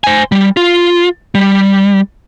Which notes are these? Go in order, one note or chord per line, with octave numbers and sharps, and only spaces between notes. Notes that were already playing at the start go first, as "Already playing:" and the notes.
C5 G#5
G3
F4
G3